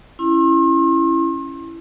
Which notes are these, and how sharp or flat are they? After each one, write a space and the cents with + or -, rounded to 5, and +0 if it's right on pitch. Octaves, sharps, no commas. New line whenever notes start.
C#4 +0 E4 +15 C6 +40